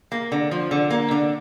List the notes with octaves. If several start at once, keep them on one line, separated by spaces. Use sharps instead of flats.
A#3
D3
F3
D3
A#3
D3